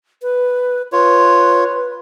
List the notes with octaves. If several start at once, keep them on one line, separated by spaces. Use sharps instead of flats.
B4
F4 B4 C#5